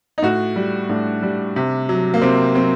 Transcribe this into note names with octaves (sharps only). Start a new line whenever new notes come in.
D#4
A2 F#4
G3
A2 D4
G3
C3
F#3
A#3
C3 C4
F#3 C4